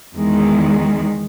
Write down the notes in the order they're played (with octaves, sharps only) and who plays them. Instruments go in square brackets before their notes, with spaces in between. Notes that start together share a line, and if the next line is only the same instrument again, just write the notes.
[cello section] E2 D#3 G#3